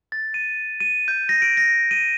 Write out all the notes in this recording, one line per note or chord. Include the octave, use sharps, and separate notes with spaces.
A6
D#7
D#7
G6
A#6
D7
A#6
D#7